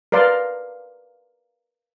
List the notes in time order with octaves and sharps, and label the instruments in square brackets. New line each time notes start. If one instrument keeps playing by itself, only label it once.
[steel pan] A#4 B4 D5 F5 C6